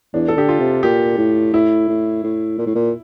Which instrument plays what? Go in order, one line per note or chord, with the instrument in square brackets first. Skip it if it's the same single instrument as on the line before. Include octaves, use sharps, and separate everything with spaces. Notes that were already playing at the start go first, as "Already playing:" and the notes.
[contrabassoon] E2 [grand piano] D4
[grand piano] A4
[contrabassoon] D3 [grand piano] G4
[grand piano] F4
[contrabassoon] C3
[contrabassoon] A#2 [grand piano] G4
[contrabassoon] A2
[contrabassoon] A2 [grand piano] E4
[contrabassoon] A2
A2
A#2
A2
A#2